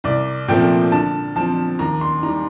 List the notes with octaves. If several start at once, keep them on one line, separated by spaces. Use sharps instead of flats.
C2 D5
A#2 F3 A3 C4 G5
D3 A5
F3 C4 A5
D#2 A#5
C6
D#3 G3 A#5